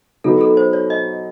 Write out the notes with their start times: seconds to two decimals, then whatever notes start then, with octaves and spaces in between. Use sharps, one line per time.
0.24 B2 F#3 B3 D#4 A4
0.41 A4
0.57 C5
0.73 C#5
0.90 D#5